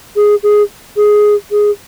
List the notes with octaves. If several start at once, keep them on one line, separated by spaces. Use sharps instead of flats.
G#4
G#4
G#4
G#4